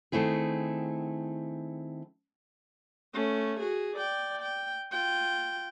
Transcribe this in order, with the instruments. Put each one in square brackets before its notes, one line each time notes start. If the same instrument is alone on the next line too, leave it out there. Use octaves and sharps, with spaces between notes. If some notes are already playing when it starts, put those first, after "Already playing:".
[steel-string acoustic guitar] D#3 A3 C4 E4 G#4
[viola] A3 C#4
F#4 G#4
D5 G5
G5
F4 G5